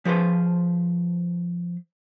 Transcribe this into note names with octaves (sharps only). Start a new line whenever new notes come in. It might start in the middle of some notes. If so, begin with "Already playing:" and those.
F3 G#4 B4 C5